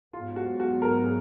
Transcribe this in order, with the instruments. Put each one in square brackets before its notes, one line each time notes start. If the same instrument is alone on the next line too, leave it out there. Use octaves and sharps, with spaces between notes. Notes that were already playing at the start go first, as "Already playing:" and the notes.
[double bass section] G#2 F#3 B3 [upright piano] F4
[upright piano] F#4
F#4
A#4
G#4